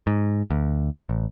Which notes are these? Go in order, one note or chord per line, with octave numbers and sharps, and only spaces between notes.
G#2
D2
A1